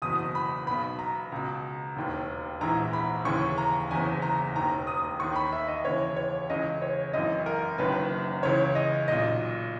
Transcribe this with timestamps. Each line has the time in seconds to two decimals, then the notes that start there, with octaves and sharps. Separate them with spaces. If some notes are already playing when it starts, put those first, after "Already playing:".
0.02 F#1 E2 B2 D#6
0.35 B5
0.67 B1 B2 B5
0.99 A#5
1.32 C#2 B2
1.96 E1 D#2 D#3
2.61 A#1 G#2 E3 A#5
2.93 B5
3.25 D#2 C#3 E3 C#6
3.58 A#5
3.91 F#1 E2 C#3 G#5
4.22 A#5
4.55 E1 D#2 D#3 A#5
4.87 D#6
5.20 D#2 D#3 C#6
5.36 B5
5.52 E5
5.68 D#5
5.84 D#2 C#3 E3 C#5
6.16 C#5
6.50 C#2 C#3 E3 D#5
6.82 C#5
7.13 G#1 F#2 E3 D#5
7.46 A#4
7.78 F#1 F#2 D#3 B4
8.43 C#2 C#3 E3 C#5
8.75 D#5
9.08 B1 A#2 D#5